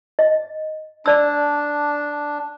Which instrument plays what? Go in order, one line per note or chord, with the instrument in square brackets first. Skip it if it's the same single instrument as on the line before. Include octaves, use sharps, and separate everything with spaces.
[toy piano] D#5
[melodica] D4 [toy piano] D5 E6